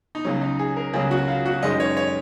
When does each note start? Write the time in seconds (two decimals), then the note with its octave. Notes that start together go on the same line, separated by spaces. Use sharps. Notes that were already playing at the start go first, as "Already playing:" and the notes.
0.15 D#4
0.24 C#2 C#3 F#3 C#4
0.41 D#4
0.59 G#4
0.76 A#4
0.93 C#2 C#3 F#3 G#4
1.11 F#4
1.28 F4
1.46 F#4
1.63 F#2 D#3 G#3 D#5
1.80 C#5
1.97 C#5